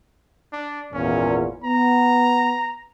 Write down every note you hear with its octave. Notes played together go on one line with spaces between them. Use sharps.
D4
G#1 E2 A#2 C#4
B3 A#5